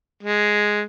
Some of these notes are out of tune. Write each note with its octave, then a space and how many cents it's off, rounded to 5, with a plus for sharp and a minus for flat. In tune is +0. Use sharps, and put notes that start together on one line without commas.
G#3 +0